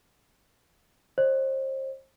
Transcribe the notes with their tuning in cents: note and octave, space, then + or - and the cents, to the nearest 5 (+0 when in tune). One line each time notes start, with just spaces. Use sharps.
C5 +35 D#5 -45